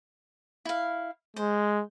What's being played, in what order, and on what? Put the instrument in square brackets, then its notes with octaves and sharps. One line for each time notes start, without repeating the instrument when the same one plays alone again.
[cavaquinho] E4 F5
[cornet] G#3 [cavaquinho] C5